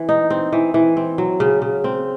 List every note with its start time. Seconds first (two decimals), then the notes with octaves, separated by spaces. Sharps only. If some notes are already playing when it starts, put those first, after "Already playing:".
Already playing: E3 C4
0.09 D#4
0.30 C4
0.52 E3
0.74 E3
0.97 C4
1.18 F#3
1.40 C#3
1.62 C#3
1.84 C4